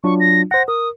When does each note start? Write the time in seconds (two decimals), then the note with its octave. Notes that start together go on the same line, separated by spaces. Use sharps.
0.04 F#3 D4 F4 C#6
0.20 A#6
0.51 C5 F#5 A#6
0.68 A#4 D#6